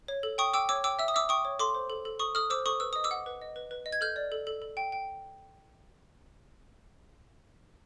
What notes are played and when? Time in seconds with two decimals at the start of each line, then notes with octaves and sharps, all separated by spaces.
0.08 C#5
0.23 A4
0.38 G5 C#6 D#6
0.54 G5 D6 E6
0.69 C#5 D6 E6
0.84 G5 D6 E6
0.99 E5 E6
1.08 D#6
1.14 E5 D6 E6
1.29 G5 C#6 D#6
1.45 C#5
1.59 A4 C6 D6
1.75 C5
1.90 A4
2.05 A4
2.19 A4 C#6 D#6
2.35 A4 D#6 F6
2.50 C5 D6 E6
2.66 A4 C#6 D#6
2.80 B4 E6
2.93 D#5 D#6
3.04 D6 E6
3.11 F#5
3.26 B4
3.42 D#5
3.56 B4
3.71 B4
3.86 D#5
3.92 G#6
4.01 A4 F6 G6
4.16 D5
4.32 A4
4.47 A4
4.62 A4
4.77 G5
4.92 G5